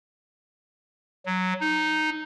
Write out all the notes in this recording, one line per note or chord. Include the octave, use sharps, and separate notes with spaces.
F#3
D#4